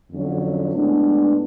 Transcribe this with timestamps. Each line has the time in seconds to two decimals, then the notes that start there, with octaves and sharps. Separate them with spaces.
0.12 F2 D3 F#3 C#4
0.75 A2 G#3 B3 D4